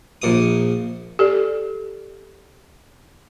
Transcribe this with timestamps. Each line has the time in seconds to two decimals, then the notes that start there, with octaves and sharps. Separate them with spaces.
0.22 A#1 A#2 D#6
1.19 G4 A4 D5